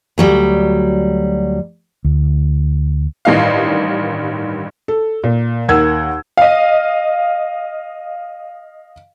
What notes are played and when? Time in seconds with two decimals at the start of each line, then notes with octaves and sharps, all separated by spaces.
0.18 D2 F#3 G3
2.05 D2
3.25 A1 G2 D#3 D#5 F5
4.88 A4
5.24 A#2
5.69 D#2 A#4 F#5 E6 G#6
6.37 D#5 F5